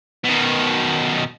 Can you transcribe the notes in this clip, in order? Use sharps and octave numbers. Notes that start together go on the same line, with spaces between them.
B2 D#3